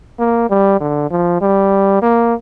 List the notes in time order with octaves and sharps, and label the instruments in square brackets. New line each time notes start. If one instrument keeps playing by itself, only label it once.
[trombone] A#3
G3
D3
F3
G3
A#3